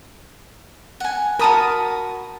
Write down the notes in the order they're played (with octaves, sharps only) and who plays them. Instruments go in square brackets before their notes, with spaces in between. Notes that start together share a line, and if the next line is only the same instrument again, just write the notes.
[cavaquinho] F#5 G#5
[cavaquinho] F#4 A5 B5 [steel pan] A#4 D#6